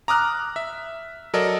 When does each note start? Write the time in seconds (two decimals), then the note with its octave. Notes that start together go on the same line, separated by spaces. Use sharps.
0.08 A#5 D6 D#6 F6 F#6
0.56 E5
1.34 F#3 A4 A#4 D5 D#5